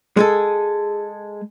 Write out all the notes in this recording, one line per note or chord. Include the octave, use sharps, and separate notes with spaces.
G#3 G#4 A4